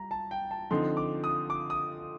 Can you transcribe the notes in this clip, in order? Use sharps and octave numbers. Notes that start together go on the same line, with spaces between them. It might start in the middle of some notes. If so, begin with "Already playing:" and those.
Already playing: G3 A#5
A5
G5
A5
D3 F3 C4 D#4 C6
D6
D#6
D6
D#6